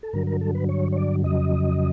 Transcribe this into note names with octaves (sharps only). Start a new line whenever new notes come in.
A4
G2 D3 F#3 A#4
A#4
A4
B4
C#5
C#5
D5
F2 C#3 F#3 D#5